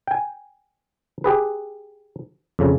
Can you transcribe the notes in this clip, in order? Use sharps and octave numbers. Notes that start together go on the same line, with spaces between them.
G5 G#5
G4 G#4 B4
F2 C#3